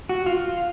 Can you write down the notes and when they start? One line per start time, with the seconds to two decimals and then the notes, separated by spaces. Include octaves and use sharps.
0.09 F#4
0.26 F4